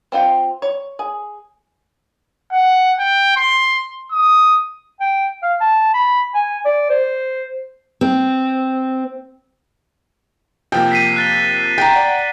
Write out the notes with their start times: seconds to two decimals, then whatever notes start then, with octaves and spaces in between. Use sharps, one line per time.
0.12 C4 F4 F5 G5
0.62 C#5
0.99 G#4
2.52 F#5
2.99 G5
3.36 C6
4.11 D#6
5.00 G5
5.42 F5
5.60 A5
5.94 B5
6.34 G#5
6.65 D5
6.90 C5
8.01 C4
10.72 C3 F3 A#3 G5
10.92 B6 C7 D#7
11.16 F#6 A6 G7
11.78 G5 A#5
11.93 D5 F#5